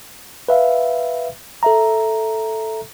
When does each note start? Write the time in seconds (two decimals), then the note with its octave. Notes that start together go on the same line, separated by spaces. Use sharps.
0.49 B4 E5 F5
1.63 A4 E5 A#5